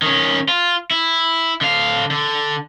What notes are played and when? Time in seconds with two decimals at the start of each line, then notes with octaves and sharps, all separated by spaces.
0.02 D#3 C#4
0.49 F4
0.91 E4
1.61 D3 F5
2.11 D3